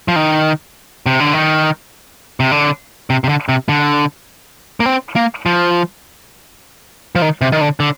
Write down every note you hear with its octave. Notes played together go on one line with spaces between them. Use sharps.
F3
D#3
C3
D3
D#3
C3
D3
C3
C3
D3
C3
D3
A#3
C4
A#3
F3
F3
D#3
C3
D#3
D3
D3